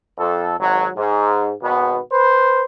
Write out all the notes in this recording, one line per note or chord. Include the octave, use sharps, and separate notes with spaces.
F2 A4
G#1 F#3
G#2
G#1 B2 B3
B4 C5